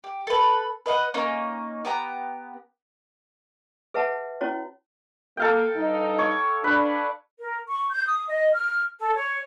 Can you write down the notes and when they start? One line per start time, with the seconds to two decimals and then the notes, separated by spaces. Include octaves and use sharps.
0.04 G4
0.27 A4 B4
0.86 B4 D#5 F5 F#5
1.14 A#3 C#4 D#4
1.85 B3 G4 A#5
3.94 G#4 B4 E5 F#5 A5
4.41 C#4 E4 F#4 C#5
5.37 A#3 A4 F5 G5
5.75 G2 D#4
6.19 C#5 D6
6.64 D4 B4
7.39 A#4
7.68 C#6
7.91 G6
8.07 D#6
8.28 D#5
8.52 F6
8.99 A4
9.15 C#5